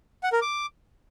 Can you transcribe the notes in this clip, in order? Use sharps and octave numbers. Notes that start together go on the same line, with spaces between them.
F#5
A#4
D6